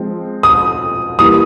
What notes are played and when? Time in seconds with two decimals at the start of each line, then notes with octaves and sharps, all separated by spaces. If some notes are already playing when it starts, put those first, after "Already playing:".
Already playing: F3 G#3 C4
0.43 D#6
1.19 E3 G3 A#3 D#6